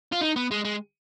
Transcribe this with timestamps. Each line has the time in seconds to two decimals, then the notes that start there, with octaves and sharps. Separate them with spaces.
0.12 F4
0.22 D#4
0.36 B3
0.51 G#3
0.65 G#3